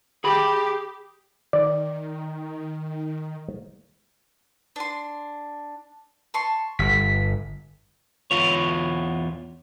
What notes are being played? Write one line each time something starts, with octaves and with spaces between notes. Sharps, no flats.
G4 G#4 B5
D#3 D5
D4 C6
A5 C6 C#6
G1 B6
E2 F4 C#5